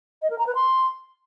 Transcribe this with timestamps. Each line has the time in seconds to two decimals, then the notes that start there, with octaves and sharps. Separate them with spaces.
0.22 D#5
0.30 A#4
0.38 A#5
0.47 B4
0.55 C6